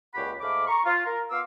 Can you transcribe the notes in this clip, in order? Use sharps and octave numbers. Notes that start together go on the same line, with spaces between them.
C#2 A#2 F#4 G4 F#5 B5
G#2 A3 F5 B5 D6
A#5 C#6
F4
A#4
B3 F4 F5 C6 D6 E6